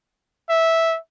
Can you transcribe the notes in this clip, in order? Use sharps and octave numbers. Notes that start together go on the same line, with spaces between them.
E5